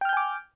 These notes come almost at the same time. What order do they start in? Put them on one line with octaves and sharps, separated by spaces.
G5 F6 G6 G#5 D6